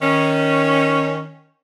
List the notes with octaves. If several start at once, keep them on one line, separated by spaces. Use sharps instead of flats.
D#3 C#4